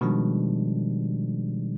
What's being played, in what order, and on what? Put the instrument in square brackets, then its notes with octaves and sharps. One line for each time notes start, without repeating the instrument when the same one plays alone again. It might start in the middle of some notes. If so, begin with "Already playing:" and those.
[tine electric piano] B2 D#3 F3 G3 G#3 D4